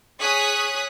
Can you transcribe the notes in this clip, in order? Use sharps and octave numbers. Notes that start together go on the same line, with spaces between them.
G#4 C#5 D#6 F#6 B6